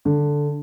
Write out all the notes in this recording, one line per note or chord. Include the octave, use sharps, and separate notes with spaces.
D3